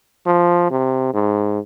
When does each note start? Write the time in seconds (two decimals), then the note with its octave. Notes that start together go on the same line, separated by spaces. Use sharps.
0.27 F3
0.71 C3
1.14 G#2